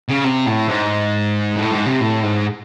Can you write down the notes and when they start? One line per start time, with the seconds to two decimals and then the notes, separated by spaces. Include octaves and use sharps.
0.09 C#3
0.24 C3
0.46 A2
0.68 G#2
1.57 A2
1.72 G#2
1.86 C3
2.01 A2
2.23 G#2